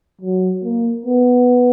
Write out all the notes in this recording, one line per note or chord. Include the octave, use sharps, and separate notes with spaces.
F#3
A#3
B3